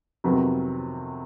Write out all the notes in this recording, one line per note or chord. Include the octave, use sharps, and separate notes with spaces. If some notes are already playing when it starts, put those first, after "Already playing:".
F2 C3 D#3 F#3 B3